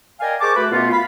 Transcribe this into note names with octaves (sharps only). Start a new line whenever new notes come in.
A#4 D5 D#5 F5 G5 G#5
G#4 A#4 C5 A5 C#6 D6
A3 F#4 B4
F#2 B2 A3 B3 F4
F5 B5